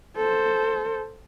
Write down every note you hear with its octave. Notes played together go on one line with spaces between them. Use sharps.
A4 C5